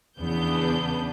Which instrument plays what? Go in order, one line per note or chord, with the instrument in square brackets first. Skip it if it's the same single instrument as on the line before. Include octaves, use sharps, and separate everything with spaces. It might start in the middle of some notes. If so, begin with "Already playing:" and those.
[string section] E2 C#3 B3 D4 G6